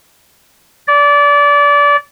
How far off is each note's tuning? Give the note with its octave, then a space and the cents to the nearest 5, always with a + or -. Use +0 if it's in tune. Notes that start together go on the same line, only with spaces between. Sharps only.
D5 -25